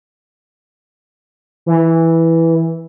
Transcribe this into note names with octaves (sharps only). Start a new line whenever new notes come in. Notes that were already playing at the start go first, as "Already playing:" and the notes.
E3